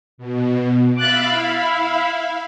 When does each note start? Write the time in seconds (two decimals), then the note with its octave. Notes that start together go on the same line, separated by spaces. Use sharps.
0.18 B2
0.97 E5 F5 B5 D6 F#6 A6
1.34 E4